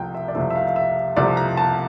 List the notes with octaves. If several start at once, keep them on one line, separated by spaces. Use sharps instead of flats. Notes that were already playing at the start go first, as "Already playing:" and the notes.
Already playing: C2 C3 F3 A3 G5
E5
D5
C2 C3 F3 A3 E5
E5
F5
F5
E5
C2 C3 F3 A3 D5
A#5
A5